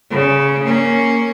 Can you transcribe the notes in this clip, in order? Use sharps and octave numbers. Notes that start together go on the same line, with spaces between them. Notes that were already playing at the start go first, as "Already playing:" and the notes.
C#3
A#3 C#4